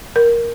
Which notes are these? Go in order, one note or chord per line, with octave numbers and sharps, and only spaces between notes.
A#4